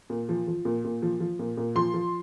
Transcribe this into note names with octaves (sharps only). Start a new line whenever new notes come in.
A#2
F3
F3
A#2
A#2
F3
F3
A#2
A#2
F3 C6
F3